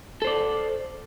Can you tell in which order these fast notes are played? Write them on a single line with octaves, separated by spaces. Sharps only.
A4 C5 D5